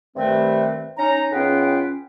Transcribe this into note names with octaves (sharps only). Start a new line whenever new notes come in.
G2 C3 D#3 A3 C4 B4
C#4 D#4 A#5
C#2 B3 C#4 F4 B4 G5